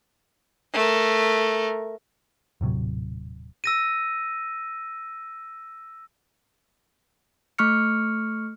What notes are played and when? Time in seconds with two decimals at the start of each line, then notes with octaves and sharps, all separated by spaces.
0.73 A3 A#4
2.61 D#1 A2 C3 F#3
3.64 E6 A#6 D#7
7.59 A3 C#6 F6 C#7